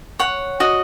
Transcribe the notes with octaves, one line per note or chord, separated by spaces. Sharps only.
C#5 F#5
F#4 D#5